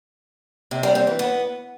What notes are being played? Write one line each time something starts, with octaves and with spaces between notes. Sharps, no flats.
C3
G3
C4
E3
B3